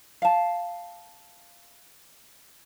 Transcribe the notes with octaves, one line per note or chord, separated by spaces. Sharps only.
F5 A5